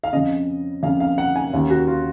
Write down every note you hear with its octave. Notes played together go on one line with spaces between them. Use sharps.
F5
F2 C#3 D#5
F2 C#3 F5
F5
F#5
G#5
D#2 C#3
F#4
F4